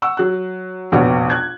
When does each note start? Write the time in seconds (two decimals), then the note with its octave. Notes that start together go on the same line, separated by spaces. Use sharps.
0.02 F#5 C#6 E6
0.17 F#3 F#6
0.92 F1 A#1 B2 B3 C#5 F#5
1.30 F#6 G#6